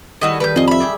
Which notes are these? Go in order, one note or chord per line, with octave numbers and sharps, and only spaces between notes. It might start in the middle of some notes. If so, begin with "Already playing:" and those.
D#3 G3 A3 E4 F#4 D#5
D#3 G3 A3 B4 G6
F2 G#4 D#5
E5 B5
G4 G#4 D5